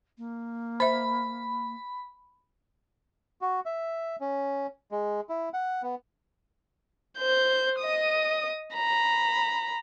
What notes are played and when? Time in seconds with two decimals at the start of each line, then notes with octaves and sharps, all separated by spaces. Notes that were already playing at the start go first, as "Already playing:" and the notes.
0.18 A#3
0.80 C5 E5 B5
3.41 F#4
3.65 E5
4.20 C#4
4.92 G#3
5.29 E4
5.54 F#5
5.82 B3
7.18 C5 G6
7.80 D#5 D#6
8.74 A#5 B5